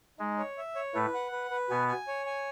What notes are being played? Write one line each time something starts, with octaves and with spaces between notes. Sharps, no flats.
G#3 D#4
C#5
E5
C#5
A2 A3 B4
F#5
B4
B4
B2 B3 G#5
G#5
C#5
G#5